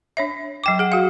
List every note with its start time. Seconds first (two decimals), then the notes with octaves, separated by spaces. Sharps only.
0.17 D4 C#5 E5
0.64 F#3 G5 D6
0.79 G#4 F#5
0.92 F#4 F5